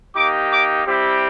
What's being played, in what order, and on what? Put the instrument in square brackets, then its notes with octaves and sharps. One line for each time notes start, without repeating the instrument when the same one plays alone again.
[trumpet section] A#3 D#4 G4 D6
D6
G3 C4 E4 G4